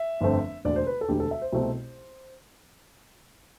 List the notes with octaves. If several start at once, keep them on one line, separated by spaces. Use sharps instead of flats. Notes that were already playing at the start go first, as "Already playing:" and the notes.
Already playing: E5
G1 F2 D3 A3 C4
E1 D2 D3 D5
C5
B4
A4
E1 D2 D3 G4
A4
E5
C5
C2 B2 A3 C4